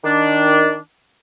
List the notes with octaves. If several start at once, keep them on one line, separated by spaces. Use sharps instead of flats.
D#3 D4